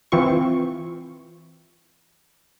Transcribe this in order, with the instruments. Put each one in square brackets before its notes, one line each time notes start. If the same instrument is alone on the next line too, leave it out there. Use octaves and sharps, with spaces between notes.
[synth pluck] E3 C4 F4 C#6